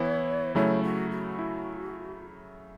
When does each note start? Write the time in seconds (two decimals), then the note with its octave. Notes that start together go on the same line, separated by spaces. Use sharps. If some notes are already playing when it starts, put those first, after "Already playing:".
Already playing: E3 B3 E4 C#5
0.55 C#3 F#3 A3 E4 C#5
0.83 F#4
1.11 F#4
1.39 E4